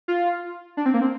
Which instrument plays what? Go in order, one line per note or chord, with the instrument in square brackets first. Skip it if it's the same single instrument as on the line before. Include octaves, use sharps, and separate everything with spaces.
[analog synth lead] F4
D4
C4
A#3
C4